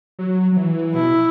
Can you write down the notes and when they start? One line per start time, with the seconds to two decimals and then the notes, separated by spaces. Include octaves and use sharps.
0.19 F#3
0.52 F#3
0.57 E3
0.94 B2 E4